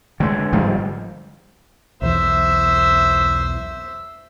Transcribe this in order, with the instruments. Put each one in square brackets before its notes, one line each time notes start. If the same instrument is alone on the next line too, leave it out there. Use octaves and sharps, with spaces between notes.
[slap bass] D3 G#3
G1 G#2 F3 G3
[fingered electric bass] B1 E2 E3 [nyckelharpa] C5 E5